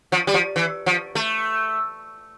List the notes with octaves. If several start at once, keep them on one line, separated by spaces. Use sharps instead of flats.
F3
G3
F3
E3
F3
A3